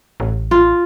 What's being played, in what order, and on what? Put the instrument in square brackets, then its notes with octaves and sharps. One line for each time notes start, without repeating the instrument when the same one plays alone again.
[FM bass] A1
[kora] F4